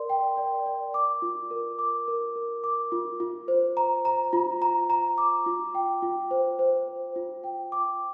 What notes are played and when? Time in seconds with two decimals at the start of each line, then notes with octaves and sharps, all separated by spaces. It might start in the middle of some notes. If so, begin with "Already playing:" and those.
Already playing: A#4 D5 C6
0.10 G5
0.37 D5
0.66 D5
0.94 D6
1.22 F4
1.51 A#4
1.79 D6
2.08 A#4
2.36 A#4
2.64 D6
2.92 F4
3.20 F4
3.48 C5
3.77 A#5
4.05 A#5
4.33 F4
4.62 A#5
4.90 A#5
5.18 D6
5.46 F4
5.75 G5
6.03 F4
6.31 C5
6.59 C5
6.88 C5
7.16 F4
7.44 G5
7.72 D6